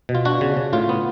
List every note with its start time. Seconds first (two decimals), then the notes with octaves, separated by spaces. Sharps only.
0.09 B2
0.15 F4
0.25 D4 F#4
0.41 C#3
0.57 C#3
0.73 A2 F4
0.89 B3